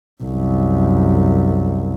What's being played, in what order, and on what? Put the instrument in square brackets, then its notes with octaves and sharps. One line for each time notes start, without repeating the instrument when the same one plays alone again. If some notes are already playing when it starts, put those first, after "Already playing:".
[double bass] C2 F#2